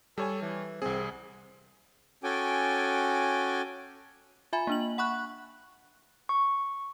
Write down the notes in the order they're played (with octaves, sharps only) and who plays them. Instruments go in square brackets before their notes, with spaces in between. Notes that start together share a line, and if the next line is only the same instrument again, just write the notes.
[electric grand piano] G3 C#5 G#5 [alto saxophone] A4
[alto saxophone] E3
[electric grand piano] C2 G#4 [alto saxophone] C4
[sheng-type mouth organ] C#4 F#4 A4 G5 G#5 D6
[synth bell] F4 E5 G#5 B5
A#3 D4 F#7
F#5 B5 C#6 F#6
[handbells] C#6